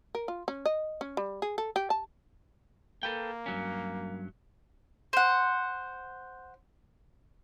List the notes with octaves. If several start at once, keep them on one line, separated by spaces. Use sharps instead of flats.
A#4
F4
C#4
D#5
C#4
G3
G#4
A4
G4
A5
A#3 A4 B4 G5
G2 F#3 C#4
C5 F#5